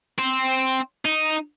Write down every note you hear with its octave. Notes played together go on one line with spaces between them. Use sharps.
C4
D#4